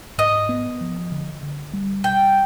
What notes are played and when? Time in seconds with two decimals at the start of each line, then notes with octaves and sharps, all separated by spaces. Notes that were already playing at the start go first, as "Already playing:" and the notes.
0.18 G#2 D#5
0.49 B3
0.81 F3
1.12 D3
1.43 D3
1.73 G3
2.04 B2 G5